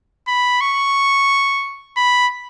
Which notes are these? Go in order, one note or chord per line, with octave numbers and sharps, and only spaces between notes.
B5
C#6
B5